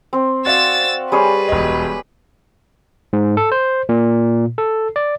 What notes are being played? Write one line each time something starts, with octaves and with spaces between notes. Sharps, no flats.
C4
F#4 D5 F5 E6 A6
G3 G#4 B4 C#5
E1 D#5
G#2
A4
C5
A#2
A4
D5